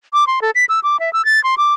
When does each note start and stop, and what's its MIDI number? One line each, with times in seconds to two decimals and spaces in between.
0.14 0.27 86
0.27 0.40 84
0.42 0.51 69
0.55 0.65 95
0.69 0.80 88
0.83 0.99 86
1.00 1.12 76
1.13 1.25 88
1.25 1.42 93
1.44 1.55 84
1.58 1.74 86